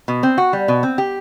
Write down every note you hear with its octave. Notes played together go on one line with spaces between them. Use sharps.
B2
C4
F#4
G3
B2
C4
G4